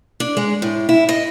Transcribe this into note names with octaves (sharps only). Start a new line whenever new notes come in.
D4
G#3
A2
E4
D#5